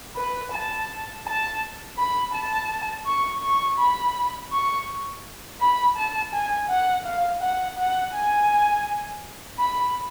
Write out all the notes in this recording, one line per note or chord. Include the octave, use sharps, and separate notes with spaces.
B4
A5
A5
B5
A5
C#6
C#6
B5
C#6
B5
A5
G#5
F#5
F5
F#5
F#5
G#5
B5